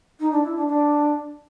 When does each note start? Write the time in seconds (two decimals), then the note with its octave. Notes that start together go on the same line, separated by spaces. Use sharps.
0.20 D#4
0.32 D4
0.44 E4
0.56 D4
0.68 D4